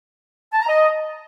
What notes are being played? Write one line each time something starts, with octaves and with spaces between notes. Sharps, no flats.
A5
A#5
D#5